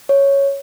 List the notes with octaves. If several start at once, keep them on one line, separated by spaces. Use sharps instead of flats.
C#5